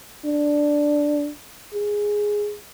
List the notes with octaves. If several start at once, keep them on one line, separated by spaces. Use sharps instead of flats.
D4
G#4